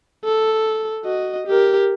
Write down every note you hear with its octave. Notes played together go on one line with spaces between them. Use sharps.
A4
F#4 D#5
G4 A#4